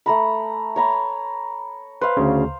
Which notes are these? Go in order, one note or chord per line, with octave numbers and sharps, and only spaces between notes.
A3 A#5 B5
C#5 A#5 B5
B4 C5 F5
D2 C#3